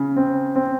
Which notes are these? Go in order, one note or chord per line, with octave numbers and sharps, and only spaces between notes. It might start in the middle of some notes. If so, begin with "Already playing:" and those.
Already playing: C#3
C4
C4